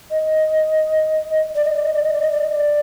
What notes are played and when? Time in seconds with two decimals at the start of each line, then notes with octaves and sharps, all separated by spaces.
0.11 D#5
1.56 D5
1.65 D#5
1.75 D5
1.85 D#5
1.94 D5
2.03 D#5
2.13 D5
2.22 D#5
2.32 D5
2.41 D#5
2.50 D5